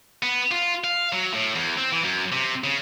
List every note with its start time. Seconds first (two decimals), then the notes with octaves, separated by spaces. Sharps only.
0.22 B3
0.51 F4
0.84 F5
1.13 F#3
1.34 A2
1.55 E2
1.77 C4
1.92 E3
2.04 F#2
2.32 C3
2.64 C#3